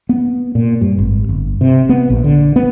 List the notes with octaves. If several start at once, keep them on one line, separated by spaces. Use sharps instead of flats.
B3
A#2
G2
G#1
G1
C3
B3
A#1
D3
B3